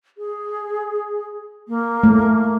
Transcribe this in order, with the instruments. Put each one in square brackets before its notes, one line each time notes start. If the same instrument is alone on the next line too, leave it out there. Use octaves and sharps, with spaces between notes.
[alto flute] G#4
A#3
[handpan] A3